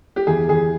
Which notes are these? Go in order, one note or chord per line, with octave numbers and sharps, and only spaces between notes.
G4
E2 G#4
E2 G#4